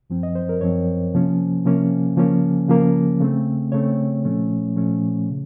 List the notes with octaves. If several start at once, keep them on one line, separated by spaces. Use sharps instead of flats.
F#2 F3 C4
D#5
C5
A#4
F#2 F3 C4 C#5
C3 F3 A#3 C#4
C3 F3 A#3 C#4
C#3 F3 A#3 C#4
C#3 F3 A#3 C#4
C#3 A3 C4
C#3 A3 C4 C#5
A#2 F3 A3 C#4
A#2 F3 A3 C#4
C#3